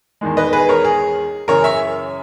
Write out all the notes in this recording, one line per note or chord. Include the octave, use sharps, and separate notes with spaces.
E2 D#3 G#3
B4 D#5
G#4 B4
A#4 C#5
G#4
F#2 C#3 E3 A#4 C#5
C#5 E5